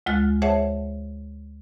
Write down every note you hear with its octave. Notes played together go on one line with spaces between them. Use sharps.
D2 G#3 F4 F6 F#6 A6
G#4 C5 C#5 E5 F#5 A5